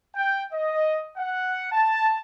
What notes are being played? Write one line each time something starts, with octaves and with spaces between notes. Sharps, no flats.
G5
D#5
F#5
A5